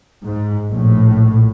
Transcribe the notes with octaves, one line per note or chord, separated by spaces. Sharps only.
G#2
A#1 A2